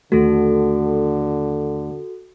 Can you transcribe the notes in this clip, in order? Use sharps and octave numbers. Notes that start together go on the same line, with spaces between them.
D#2 D3 A3 F#4 A4